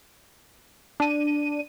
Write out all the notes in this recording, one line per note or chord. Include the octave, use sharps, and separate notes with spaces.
D4 D#7